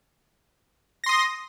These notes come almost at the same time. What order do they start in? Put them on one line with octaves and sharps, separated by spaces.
A#6 C6 D#6